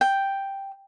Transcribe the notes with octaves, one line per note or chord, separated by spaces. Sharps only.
G5